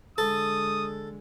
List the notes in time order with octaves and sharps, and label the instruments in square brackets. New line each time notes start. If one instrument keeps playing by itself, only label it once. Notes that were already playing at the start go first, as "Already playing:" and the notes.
[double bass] D3 G#3 [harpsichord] A4 [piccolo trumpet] D#6